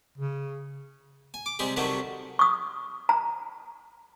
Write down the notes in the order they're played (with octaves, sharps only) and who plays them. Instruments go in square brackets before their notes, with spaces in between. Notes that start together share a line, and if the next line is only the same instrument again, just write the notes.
[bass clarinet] C#3
[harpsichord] G#5
D6
C3 G3 G#3 G#4
C3 D#3 F#3 G3 A3 F#4
[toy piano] C#6 D#6
A#5